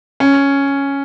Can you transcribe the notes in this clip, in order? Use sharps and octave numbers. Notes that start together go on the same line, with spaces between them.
C#4